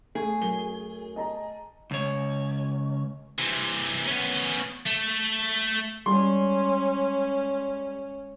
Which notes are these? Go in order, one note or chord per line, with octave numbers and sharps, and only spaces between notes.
A3 G#4
F#2 G7
D#5 A5 A#5
C#2 C#5
C3 E3
B3 C#4
A3
G3 G#3 C#4 C6